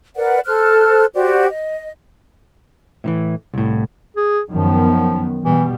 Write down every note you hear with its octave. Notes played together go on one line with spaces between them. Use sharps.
A#4 B4 D5 F#5
A4 C5 F6 F#6
F#4 G4 C5 D5
D#5
A2 D#3 E3
C2 A2
G#4
F#2 D#3 F3 B3
B2 E3 G3